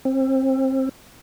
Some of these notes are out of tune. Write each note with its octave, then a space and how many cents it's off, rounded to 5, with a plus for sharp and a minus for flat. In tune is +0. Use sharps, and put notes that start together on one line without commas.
C4 +25